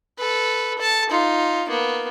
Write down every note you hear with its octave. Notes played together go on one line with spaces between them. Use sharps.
A4 B4
A4 A5
D#4 F4
A#3 B3